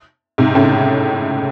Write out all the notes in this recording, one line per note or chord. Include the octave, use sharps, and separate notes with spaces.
G#2 C3
A2 C#3